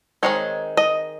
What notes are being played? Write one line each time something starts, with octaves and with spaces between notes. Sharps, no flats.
D#3 G#3 C4 D#4 C#5
D#5